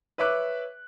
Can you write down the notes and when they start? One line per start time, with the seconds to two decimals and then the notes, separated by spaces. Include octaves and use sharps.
0.18 B4 C#5 E5 D6 F#6